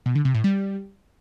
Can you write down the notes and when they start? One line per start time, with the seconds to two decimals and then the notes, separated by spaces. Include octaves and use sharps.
0.06 B2
0.15 D3
0.25 C3
0.35 A2
0.44 G3